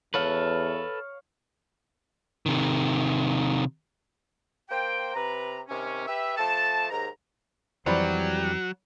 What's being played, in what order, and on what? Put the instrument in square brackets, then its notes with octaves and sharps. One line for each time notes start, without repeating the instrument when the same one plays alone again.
[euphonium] E2 [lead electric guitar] A4 B4 [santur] C#5 F5
[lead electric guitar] C3 D#3
[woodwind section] A#3 C5 G5
C3 B4 A#5
C3 D#3 C#4
G4 B4 E5
F3 A3 A5
D#2 G#2 A#5
[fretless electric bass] F2 E3 [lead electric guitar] F#3 [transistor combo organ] G3 [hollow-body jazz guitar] C5 D5 B5